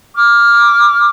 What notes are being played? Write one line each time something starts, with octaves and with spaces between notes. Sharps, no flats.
D6 F6